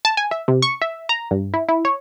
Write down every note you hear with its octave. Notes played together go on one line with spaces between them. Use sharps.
A5
G#5
E5
C3
C#6
E5
A#5
G2
E4
E4
C#5